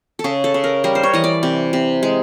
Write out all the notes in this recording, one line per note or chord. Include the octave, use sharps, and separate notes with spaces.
A4
C#3 G#4
A4
C#3
A#4
G3 A#4
C5
C#5
E3 D#5
D5
C3
C3
G#3